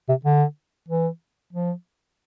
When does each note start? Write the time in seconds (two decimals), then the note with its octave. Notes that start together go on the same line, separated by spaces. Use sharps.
0.09 C3
0.25 D3
0.89 E3
1.53 F3